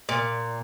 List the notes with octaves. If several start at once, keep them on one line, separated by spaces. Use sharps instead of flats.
A#2